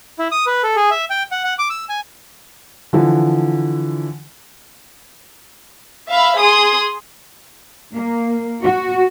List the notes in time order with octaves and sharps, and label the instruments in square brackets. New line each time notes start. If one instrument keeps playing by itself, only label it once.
[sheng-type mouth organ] E4
D#6
B4
A4
G#4
E5
G5
F#5
F#5
D6
E6
G#5
[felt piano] D3 E3 F3
[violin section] E5 F5 B5
G#4 C6 D#6
[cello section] A#3
F#4